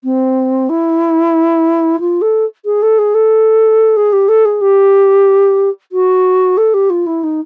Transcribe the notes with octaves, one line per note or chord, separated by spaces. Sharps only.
C4
E4
F4
A4
G#4
A4
G#4
A4
G#4
G4
A4
G#4
G4
F#4
A4
G4
F4
E4
D#4